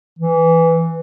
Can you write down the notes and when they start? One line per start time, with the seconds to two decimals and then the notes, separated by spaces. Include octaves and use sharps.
0.19 E3